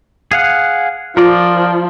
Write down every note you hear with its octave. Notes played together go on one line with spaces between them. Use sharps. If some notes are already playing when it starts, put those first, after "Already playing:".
G#4 F5 F#5
F3 F4 A#4 D5